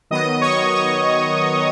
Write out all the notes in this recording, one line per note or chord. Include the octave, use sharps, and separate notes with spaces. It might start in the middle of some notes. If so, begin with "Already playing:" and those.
D#3 F#3 B3 D#5 D#6
C#5 C#6
C#5 C#6